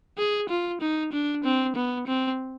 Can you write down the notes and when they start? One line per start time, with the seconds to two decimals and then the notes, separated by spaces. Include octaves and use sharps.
0.18 G#4
0.49 F4
0.81 D#4
1.13 D4
1.44 C4
1.75 B3
2.07 C4